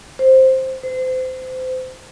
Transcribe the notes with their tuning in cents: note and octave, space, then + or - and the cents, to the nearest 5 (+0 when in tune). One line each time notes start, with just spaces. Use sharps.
C5 +5
C5 -25